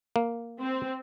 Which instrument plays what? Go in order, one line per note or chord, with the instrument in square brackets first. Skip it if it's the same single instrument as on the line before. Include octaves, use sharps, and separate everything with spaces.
[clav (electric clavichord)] A#3
[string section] C4